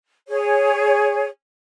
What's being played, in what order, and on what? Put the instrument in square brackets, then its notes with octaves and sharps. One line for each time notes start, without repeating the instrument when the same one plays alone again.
[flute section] G#4 C#5